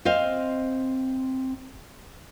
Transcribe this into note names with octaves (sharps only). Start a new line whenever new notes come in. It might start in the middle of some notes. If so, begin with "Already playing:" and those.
C4 C5 D#5 F5